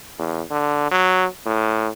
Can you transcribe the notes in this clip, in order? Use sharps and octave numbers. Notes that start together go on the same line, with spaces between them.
E2
D3
F#3
A2